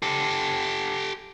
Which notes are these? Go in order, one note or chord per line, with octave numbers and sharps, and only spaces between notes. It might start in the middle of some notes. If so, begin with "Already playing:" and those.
G4 A4